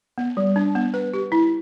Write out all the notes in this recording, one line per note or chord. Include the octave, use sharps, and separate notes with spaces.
B3
G3
D4
B3
B4
G4
E4